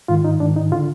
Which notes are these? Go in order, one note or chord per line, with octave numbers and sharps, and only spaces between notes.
G#2 D#3 F4
D#4
G#2 D#3 D4
D#4
D3 F4